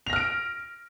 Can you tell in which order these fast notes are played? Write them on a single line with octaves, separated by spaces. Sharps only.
F7 A#6 F6 D7